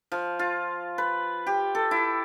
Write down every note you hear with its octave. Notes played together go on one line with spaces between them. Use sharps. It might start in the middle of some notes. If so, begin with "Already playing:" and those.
F3
F4
B4
G4
A4
E4